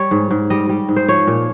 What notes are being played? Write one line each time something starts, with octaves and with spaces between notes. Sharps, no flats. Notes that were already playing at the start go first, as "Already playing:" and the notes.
Already playing: G3 C#5
G#2
G#2
G3 D#5
G3
G#2
C5
F3 C#5
A#2